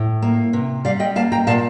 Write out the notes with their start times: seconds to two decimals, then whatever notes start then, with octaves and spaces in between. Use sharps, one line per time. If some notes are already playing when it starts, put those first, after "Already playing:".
Already playing: A2
0.22 A#3
0.53 C3
0.85 G3 D5 F5
1.00 D#5 G5
1.16 A#3 F5 A5
1.32 G5 A#5
1.47 A#2 F5 A5